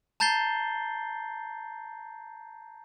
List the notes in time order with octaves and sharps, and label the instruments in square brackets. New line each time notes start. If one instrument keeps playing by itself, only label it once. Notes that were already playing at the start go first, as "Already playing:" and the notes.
[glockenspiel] A5 A#5 G6 A6 C7 G7